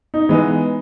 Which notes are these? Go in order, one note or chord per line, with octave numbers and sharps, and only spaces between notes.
D#4
E3 G#3 B3